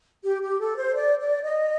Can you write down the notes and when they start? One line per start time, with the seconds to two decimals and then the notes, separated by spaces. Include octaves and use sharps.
0.24 G4
0.42 G4
0.60 A4
0.77 C5
0.95 D5
1.19 D5
1.43 D#5